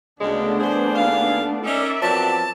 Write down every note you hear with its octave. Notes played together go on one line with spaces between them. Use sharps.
D2 C#3 G#3 A3 B3 D4
E2 G2 G#4 C5
D#2 F4 F5
C#4 D#4 A#4 D5 E5
F3 F#3 B3 C4 A5